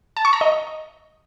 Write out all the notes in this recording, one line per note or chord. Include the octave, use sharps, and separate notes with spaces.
A5
C#6
A#5
D#5